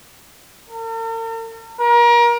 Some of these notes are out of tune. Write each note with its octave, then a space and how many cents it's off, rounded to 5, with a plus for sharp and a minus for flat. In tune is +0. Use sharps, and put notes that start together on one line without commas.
A#4 -45
A#4 +30